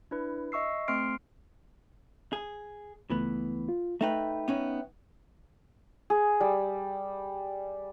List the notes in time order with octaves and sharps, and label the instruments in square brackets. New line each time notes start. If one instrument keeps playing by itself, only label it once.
[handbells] D4 E4 B4
D#5 E5 C#6 E6 C7
A3 C4 C6 F6 C7 D7
[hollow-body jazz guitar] G#4
[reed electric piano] C#2 A3 [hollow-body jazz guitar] E3 B3
[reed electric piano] F4
[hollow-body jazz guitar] A3 D#4 B4 [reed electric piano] E5 G5
[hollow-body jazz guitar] B3 C#4 D#4
[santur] G#4
G3